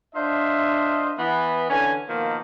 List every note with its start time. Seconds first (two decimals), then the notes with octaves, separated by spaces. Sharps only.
0.15 D4 F4 C5 D#5 E5
1.19 E3 B3
1.70 D3 E3 C#4 G#5
2.09 B2 D#3 F3 A#3